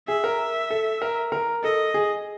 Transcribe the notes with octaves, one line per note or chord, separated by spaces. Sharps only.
G#4 E5
A#4
A4
A#4
A#4
A4 D#5
G#4